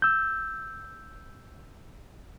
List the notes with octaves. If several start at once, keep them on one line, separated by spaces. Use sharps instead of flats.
E6 G6